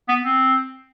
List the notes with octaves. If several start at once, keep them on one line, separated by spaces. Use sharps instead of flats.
B3
C4